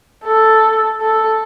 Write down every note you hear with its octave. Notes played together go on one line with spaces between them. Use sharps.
A4
A4